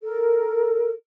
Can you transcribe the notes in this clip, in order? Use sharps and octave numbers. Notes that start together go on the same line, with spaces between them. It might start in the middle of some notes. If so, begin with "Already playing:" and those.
A4 A#4